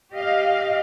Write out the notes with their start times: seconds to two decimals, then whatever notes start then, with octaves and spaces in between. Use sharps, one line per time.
0.13 G4 D#5 F5